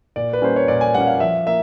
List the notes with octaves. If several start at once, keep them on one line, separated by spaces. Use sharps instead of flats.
A#2 D5
B4
G3 A#3 C#4 C5
C#5
A#2 D5
G#5
G3 A#3 C#4 F#5
F5
F3 E5
A#3 E5